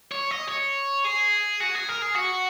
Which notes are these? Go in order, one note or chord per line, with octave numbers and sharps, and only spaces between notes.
C#5
D#5
C#5
G#4
F#4
G#4
A#4
G#4
F#4